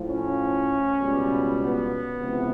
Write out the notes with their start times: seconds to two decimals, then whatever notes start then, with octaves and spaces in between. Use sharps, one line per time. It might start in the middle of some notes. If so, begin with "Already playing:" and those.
Already playing: A2 F3
0.09 C#4
0.98 C#2 B2 G3
1.59 B3
2.19 C#2 C3 E3